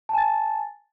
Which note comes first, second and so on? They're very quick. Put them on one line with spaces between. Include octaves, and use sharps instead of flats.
A5 G#5 A6